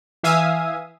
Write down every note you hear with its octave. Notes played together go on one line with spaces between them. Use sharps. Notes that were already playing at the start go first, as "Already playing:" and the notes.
E3 E5 F5 G#5 D#6